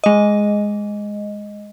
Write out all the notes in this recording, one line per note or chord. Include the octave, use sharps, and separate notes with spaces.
G#3 D#5